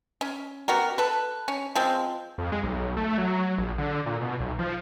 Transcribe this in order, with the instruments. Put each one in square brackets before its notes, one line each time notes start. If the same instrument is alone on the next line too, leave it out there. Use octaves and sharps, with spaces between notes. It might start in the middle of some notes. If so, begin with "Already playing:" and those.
[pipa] C#4
B3 F#4 G4 A#4
A4 B4
C#4
F3 G#3 C4
[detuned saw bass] F2
G#3
B1
A3
F#3
A#1
D3
A#2
B2
B1
F3